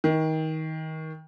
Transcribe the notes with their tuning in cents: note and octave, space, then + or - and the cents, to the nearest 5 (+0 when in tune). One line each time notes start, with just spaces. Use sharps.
D#3 +25